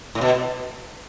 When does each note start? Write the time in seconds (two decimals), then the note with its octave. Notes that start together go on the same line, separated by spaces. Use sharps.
0.15 A2
0.21 B2